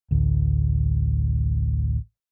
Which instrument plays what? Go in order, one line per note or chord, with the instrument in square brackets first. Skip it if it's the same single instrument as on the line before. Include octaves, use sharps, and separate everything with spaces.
[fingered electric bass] A1 D2